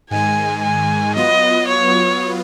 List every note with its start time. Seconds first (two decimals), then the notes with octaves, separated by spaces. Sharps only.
0.10 G#2 D#3 G#3 G#5
0.63 G#5
1.15 F#3 B3 F4 D#5
1.68 C#5